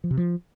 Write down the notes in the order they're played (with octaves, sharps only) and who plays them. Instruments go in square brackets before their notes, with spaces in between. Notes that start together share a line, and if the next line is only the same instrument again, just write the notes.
[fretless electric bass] F3
C3
F3